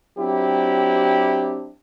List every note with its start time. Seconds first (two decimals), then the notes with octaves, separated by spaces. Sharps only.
0.17 F#3 C4 D4 E4 G4